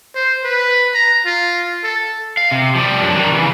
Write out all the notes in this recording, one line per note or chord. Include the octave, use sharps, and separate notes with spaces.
C5
B4
A#5
F4
A4
F5
C3
F3 G3
F#2 D4
D#3 G3
C#3 E3